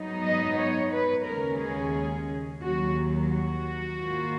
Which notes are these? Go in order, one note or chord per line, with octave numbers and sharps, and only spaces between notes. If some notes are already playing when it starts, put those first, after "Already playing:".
Already playing: G#2 F#3 B3 D#4
D#5
C#5
B4
D#2 C#3 G#3 C#4 A#4
G#4
D#2 D#3 F#3 F#4
F#4
G#2 D#3 A#3 F4